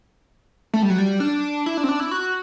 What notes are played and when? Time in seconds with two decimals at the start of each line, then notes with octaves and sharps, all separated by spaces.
0.74 A3
0.83 G3
0.90 F#3
0.98 G3
1.20 D4
1.66 E4
1.77 D4
1.83 C4
1.89 D4
2.00 E4
2.11 F#4